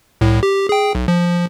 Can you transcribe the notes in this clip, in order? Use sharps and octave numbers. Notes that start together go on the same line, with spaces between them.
C2 A2
G4
G#4 G5
B1
F3